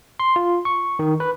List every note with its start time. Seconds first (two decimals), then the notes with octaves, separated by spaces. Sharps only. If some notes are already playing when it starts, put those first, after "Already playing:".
0.20 C6
0.36 F4
0.65 C#6
0.99 D#3
1.20 B4